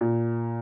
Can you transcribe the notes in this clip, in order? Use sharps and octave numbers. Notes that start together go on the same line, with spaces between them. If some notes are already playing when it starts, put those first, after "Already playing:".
A#2